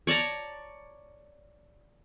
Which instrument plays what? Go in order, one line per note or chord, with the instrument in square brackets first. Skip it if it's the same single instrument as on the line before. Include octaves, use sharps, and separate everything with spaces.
[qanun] C#5 D5 A5 A#5